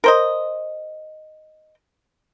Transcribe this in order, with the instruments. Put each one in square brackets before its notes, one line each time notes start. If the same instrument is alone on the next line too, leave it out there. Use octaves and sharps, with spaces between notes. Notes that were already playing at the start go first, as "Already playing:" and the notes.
[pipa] A#4 C5 D#5